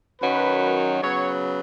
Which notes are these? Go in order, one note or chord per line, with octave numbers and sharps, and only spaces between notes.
F#2 D#3 F#3 B4
C#3 F#3 B3 C#5